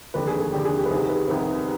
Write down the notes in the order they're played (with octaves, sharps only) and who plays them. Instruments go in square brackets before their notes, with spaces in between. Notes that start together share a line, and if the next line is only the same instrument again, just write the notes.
[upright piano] F1 D#2 D3 B4
G#4
G#4
F1 D#2 D3 G4
G#4
G4
B4
C2 C3 D#3 B3 G#4
B4
C2 C3 D#3 B3